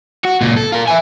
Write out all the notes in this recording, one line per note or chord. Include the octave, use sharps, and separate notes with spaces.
F#4
C#2 A#2
A4
F4 A#4
E5 G#5